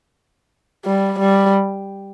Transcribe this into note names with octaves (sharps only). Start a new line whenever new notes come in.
G3
G3